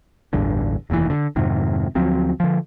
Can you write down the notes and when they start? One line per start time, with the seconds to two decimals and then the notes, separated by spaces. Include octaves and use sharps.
0.33 A1 E2 G2 D3
0.90 F1 D#2 A#2 E3
1.10 D3
1.36 F2 G#2 C3 D#3
1.95 D2 F3 F#3 C4
2.40 D3 F3